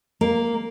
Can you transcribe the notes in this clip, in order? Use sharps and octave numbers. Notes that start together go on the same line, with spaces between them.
A#3